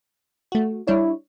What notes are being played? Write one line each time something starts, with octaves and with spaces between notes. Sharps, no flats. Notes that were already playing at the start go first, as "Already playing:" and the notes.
A3 F#4
G3 D4 E4 C#5